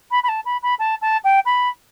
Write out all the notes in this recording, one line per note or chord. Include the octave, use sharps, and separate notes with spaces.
B5
B5
A5
B5
B5
A5
A5
G5
B5